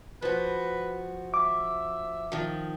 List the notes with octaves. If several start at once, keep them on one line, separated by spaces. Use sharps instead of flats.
F3 F#4 B4
E5 D6
D#3 F3